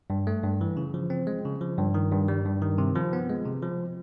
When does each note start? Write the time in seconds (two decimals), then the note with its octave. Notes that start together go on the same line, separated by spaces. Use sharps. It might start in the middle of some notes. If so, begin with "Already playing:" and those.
0.10 G2
0.27 A3
0.43 G2
0.61 E3
0.77 C#3
0.94 F3
1.10 C4
1.27 G#3
1.45 C#3
1.61 F3
1.78 G2
1.94 D#3
2.12 G2
2.28 G3
2.45 G2
2.62 D#3
2.78 C3
2.96 F3
3.13 B3
3.29 G#3
3.46 C3
3.62 F3